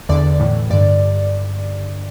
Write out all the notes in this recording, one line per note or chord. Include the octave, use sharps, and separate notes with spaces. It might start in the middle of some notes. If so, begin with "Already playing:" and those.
E2 D3 D5
A2 E3
G2 D3 D5